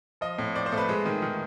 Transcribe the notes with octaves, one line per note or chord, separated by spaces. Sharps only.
F3 D#5
A2
C4 D5
C5
A3
B4
G#3
D#3
D#3